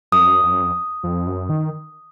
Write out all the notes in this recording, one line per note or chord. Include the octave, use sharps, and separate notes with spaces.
F#2 D#6
F2
F#2
F2
F#2
F2
F2
F#2
D#3